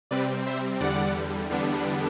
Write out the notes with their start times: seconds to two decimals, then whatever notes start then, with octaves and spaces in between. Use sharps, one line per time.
0.11 C3 G3 C4 B4 D5
0.46 C5 E5
0.80 E2 D3 G3 D5 F#5
1.50 E2 D3 G3 B3 D4